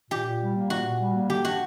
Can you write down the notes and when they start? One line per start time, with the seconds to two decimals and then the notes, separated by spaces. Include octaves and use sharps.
0.11 A#2 G4
0.26 A#2
0.41 G3
0.56 A#3
0.70 A#2 F#4
0.86 A#2
1.00 G3
1.15 A#3
1.29 D3 G4
1.45 D4 F#4